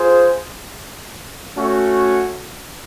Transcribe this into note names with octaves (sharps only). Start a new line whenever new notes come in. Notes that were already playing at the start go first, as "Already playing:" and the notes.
Already playing: F4 G#4 C5
A3 C#4 F#4